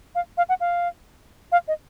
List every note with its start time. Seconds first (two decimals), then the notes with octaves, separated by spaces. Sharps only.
0.15 F5
0.38 F5
0.49 F#5
0.60 F5
1.52 F5
1.68 D#5